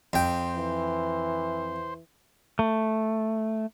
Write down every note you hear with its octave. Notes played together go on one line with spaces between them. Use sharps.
F2 C5 G5
E3
A3